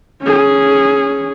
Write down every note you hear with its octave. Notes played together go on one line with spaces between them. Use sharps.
C#4 G#4